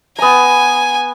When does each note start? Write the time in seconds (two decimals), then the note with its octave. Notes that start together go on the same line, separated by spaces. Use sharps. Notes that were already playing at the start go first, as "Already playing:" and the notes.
0.19 B3 G#5 A#5